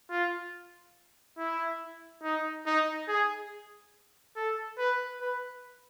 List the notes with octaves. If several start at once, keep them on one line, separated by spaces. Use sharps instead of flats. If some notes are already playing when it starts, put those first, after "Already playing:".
F4
E4
D#4
D#4
G#4
A4
B4
B4